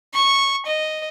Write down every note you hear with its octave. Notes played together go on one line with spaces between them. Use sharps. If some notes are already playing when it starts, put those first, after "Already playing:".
C#6
D#5